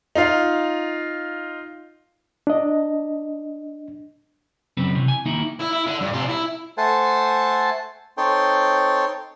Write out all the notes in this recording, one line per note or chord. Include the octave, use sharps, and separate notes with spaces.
D#4 F4 F5
D4 D#5
F#2 C#3 C4 B4
C3 E3
G#5
D#3 A#3 D#4 E4
E4
E4
D3
G2
C3 F4
E4
A3 A4 C5 F#5 G#5 A5
C4 D#4 A4 C#5 G5 C6